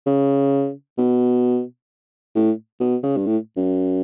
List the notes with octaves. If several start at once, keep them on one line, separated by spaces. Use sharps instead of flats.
C#3
B2
A2
B2
C#3
G2
A2
F#2